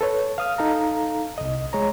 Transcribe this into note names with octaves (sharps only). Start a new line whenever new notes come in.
A4 B4 C#5
F5 D#6 F6
D#4 A4 F5 A#5
C2 D#5
G#3 C#5 A#5